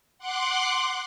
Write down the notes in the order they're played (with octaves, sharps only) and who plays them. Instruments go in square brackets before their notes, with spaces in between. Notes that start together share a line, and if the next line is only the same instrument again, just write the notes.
[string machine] F#5 C6 D6 F#6